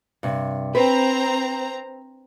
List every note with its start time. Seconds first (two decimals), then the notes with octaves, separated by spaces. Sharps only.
0.23 G2 C3
0.75 C4 B4 A#5